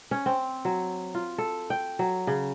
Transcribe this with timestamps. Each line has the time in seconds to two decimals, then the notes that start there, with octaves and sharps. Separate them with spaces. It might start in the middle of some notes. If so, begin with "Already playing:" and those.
0.11 C#4
0.26 C4
0.65 F#3
1.14 F4
1.38 A4
1.70 G5
1.99 F#3
2.27 C#3